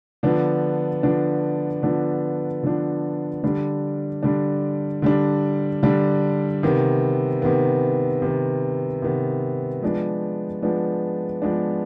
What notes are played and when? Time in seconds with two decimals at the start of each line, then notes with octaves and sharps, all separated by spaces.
0.23 D3 F3 B3 D4
1.03 D3 F3 B3 D4
1.83 D3 F3 B3 D4
2.63 D3 F3 B3 D4
3.44 D3 G3 D4
4.23 D3 G3 D4
5.02 D3 G3 D4
5.83 D3 G3 D4
6.63 C3 D#3 B3
7.42 C3 D#3 B3
8.22 C3 D#3 B3
9.02 C3 D#3 B3
9.82 F3 G#3 B3 D4
10.62 F3 G#3 B3 D4
11.42 F3 G#3 B3 D4